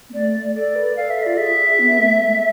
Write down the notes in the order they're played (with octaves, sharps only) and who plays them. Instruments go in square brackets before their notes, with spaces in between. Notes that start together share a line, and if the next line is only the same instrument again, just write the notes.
[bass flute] B3
[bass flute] A3 [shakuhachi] D5
[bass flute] A4 [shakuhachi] D5
[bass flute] B4
[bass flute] A4 [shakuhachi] F5
[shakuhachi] E5
[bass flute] F4 [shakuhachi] D5
[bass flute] G#4 [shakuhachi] E5
[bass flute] B3
A3
G#3